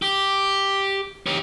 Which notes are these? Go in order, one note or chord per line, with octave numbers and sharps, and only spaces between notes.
G4
G4 C#5